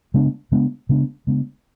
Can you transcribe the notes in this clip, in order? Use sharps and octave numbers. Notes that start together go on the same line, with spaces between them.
C#3 G#3 B3 D4
C#3 G#3 B3 D4
C#3 G#3 B3 D4
C#3 G#3 B3 D4